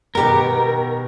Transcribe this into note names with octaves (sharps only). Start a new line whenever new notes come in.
B2 D#3 B3 G4 A#4